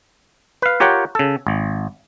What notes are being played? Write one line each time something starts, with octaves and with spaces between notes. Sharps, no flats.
B4 F5
F4 G4 A#4 C#5 F#5 G5
C#3 A4
G#1